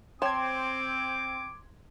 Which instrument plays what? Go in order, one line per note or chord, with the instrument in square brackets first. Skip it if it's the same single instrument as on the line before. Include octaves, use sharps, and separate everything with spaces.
[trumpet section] C4 [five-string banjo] C#5 G5 A5 [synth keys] C6 G#6 [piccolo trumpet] D6